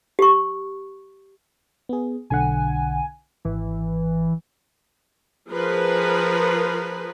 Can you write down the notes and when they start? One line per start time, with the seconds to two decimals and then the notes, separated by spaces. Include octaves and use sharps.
0.19 G4 C#6
1.89 B3 G#4
2.30 B1 D3 F#5 G#5
3.45 G#1 E3
5.50 F3 G#4 A#4 B4